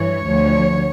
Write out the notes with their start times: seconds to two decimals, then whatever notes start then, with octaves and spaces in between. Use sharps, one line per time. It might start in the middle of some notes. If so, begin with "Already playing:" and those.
Already playing: G2 E3 C#5
0.28 D2 D3 F3